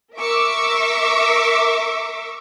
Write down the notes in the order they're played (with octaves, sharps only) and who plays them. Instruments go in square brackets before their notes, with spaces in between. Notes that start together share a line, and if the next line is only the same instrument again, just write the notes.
[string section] A#4 E5 C#6 D6 E6